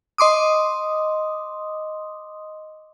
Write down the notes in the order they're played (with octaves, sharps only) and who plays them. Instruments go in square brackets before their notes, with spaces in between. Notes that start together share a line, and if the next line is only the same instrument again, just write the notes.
[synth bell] D#5 C6 D6 D#6